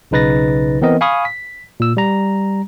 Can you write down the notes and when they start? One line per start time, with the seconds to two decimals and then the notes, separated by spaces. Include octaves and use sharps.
0.11 B1 C#3 D#4 B4 A6 A#6
0.81 E3 B3 C4 A#4 D#5
1.01 F5 G#5 B5 C#6 D#6 F6
1.25 B6
1.80 A#2 E6
1.97 G3 A#5